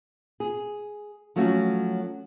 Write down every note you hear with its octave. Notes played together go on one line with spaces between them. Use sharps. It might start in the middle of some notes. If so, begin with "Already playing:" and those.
G#4
F3 F#3 A3 C#4 F#4